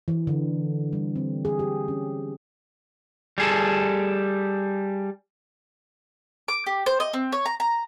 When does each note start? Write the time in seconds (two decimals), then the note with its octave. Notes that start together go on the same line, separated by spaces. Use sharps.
0.08 E3
0.27 D3
0.93 G3
1.16 C4
1.45 G#4
1.59 G4
1.88 C#4
3.38 G3 G#4 A4
6.48 D6
6.66 G4
6.86 C5
7.00 D#5
7.13 C4
7.32 C#5
7.46 A#5
7.60 A#5